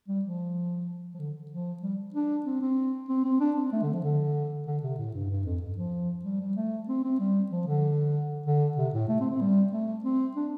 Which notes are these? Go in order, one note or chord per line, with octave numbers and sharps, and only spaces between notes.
G3
F3
F3
D3
F3
G3
D4
C4
C4
C4
C4
D4
C4
A3
D3
F3
D3
D3
C3
A2
G2
G2
F2
G2
F3
G3
G3
A3
C4
C4
G3
F3
D3
D3
C3
A2
A3
C4
C4
G3
A3
C4
D4